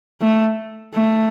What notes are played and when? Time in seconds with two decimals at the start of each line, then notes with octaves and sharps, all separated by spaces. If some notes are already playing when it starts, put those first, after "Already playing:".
0.21 A3
0.94 A3